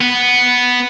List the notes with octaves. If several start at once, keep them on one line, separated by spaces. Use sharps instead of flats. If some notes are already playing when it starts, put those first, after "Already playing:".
B3